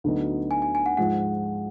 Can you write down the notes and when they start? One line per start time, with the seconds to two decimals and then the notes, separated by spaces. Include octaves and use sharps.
0.04 D2 D3 F#3 B3 D#4
0.51 G#5
0.62 G#5
0.75 G#5
0.86 F#5
0.97 G#2 F3 G#3 F#5